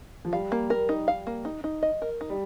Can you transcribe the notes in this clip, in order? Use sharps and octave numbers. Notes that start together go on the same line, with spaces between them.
F3
G3 F5
A#3
A#4
D#4
F5
A#3
D#4
D#4
D#5
A#4
D#4
G3